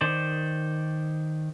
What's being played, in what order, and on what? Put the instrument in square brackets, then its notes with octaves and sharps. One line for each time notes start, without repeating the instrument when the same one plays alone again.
[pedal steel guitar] D#3 C5 D5